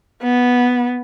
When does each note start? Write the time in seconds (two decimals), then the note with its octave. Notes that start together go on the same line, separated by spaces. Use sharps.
0.23 B3